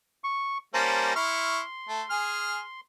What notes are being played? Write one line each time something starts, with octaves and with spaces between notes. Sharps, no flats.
C#6
G3 A#3 C#4 C5 A5 A#5
E4 C6 C#6 F6
A3
G#4 G#5 F6